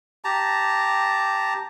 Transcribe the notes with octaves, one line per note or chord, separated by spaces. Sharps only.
G4 A5 A#5